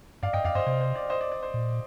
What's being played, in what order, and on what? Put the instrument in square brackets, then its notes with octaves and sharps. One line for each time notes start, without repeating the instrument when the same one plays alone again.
[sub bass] G2 [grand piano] D5 F5
[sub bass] G2 [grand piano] D#5 G5
[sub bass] F2 [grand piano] D5 F5
[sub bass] G2 [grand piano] C5 D#5
[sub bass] C3 [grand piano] C5
[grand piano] C5
D5
C5 D#5
D5
D5
C5
[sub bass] A#2